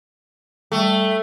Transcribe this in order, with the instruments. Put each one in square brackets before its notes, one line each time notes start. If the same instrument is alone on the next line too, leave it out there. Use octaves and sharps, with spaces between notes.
[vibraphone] G3 [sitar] A3